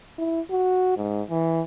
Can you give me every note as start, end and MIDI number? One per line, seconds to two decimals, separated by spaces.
0.18 0.40 64
0.51 0.94 66
0.97 1.22 44
1.30 1.62 52